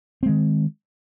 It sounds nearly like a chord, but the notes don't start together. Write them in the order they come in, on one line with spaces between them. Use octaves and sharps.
C4 G#3 D#3